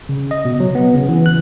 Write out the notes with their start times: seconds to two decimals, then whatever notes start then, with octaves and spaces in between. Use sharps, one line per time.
0.09 C#3
0.31 D#5
0.45 B2
0.60 F#3
0.75 B3
0.95 C#3
1.08 E3
1.26 F#6